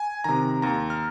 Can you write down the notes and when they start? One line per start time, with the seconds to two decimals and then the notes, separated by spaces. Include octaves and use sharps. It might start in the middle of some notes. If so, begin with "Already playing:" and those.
Already playing: G#5
0.24 C3 D#3 A#5
0.62 D#2 A#5
0.90 F6